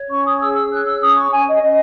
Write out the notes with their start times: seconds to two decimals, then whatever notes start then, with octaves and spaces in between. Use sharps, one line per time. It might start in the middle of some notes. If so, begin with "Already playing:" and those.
Already playing: C#5
0.09 C#4 C#6
0.25 D#6
0.40 G#4 E6
0.55 E6
0.70 C#5 F#6
0.86 E6
1.01 C#4 D#6
1.16 C#6
1.31 C#4 G#5
1.47 D#5
1.61 C#4 D#5